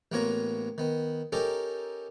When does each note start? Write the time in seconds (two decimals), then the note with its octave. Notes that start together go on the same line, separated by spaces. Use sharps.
0.12 A1 A#3 B3 F4 C#5 A#5
0.78 D#3 B3
1.32 C#4 D#4 G4 A4 A#4